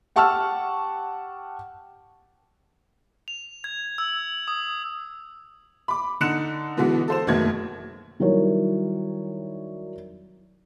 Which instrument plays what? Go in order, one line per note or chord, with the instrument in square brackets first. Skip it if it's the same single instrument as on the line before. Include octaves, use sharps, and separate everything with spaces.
[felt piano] G4 F#5 A5 C#6 E6 F6
[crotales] F7
G#6
E6
D#6
[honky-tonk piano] B5 D6
D3 D#4 F#6 C#7 E7
B2 D3 E3 G#3 B3 F#4
A4 C5 E7
F#1 B2 D#3 A3 G#6
[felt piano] D#3 F#3 G3 E4 A#4 C#5